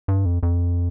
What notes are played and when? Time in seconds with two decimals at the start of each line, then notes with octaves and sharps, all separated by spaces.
0.08 G2
0.25 F2
0.43 F2